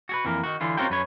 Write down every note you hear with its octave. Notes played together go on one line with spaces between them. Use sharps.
F#4 G#4 B4
F2 E3 A#3 A#4
D#3 F#4
D3 E3 F4
C4 C#4 F4 F#4 A#4 G5
F#2 B4 C#5